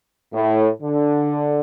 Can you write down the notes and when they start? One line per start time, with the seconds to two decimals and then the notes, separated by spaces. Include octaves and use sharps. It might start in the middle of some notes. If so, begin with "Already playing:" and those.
0.32 A2
0.81 D3